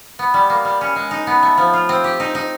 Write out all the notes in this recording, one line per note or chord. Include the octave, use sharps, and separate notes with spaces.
B3
G3
A#3
G3
C#4
G#3
D#4
B3
A3
F3
F4
C4
G4
D#4
D#4